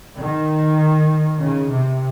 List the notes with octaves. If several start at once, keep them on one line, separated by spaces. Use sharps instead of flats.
D#3
C#3
C3